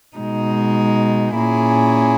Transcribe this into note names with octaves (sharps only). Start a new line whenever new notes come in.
B2 G#3 D#4
A#2 A#3 C#4 E4 G#4